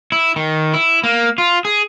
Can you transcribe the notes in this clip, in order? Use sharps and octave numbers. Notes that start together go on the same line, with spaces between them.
E4
D#3
E4
A#3
F4
G#4